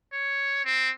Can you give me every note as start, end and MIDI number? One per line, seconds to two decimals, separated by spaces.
0.13 0.65 73
0.65 0.91 60